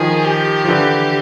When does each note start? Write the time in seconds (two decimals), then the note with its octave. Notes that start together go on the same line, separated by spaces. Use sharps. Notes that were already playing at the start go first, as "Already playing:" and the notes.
Already playing: D#3 F3 G#4
0.24 G4
0.65 F3
0.69 D3 E3